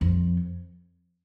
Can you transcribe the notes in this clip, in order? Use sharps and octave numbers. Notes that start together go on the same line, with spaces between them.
F2